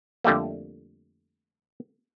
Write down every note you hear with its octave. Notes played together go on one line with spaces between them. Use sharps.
F2 D3 G3 A3 A#3